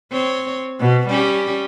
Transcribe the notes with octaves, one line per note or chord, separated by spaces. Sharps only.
C4 C#5
B2
G3 C#4 G4